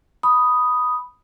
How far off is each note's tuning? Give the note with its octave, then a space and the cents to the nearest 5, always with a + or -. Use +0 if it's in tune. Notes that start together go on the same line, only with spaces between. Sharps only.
B5 +0 D#6 +0